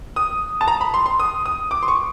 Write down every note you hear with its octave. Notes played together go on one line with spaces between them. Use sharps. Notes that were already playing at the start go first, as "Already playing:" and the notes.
D#6
A5
A#5
B5
C6
C6
D#6
D#6
D6
C6
C#6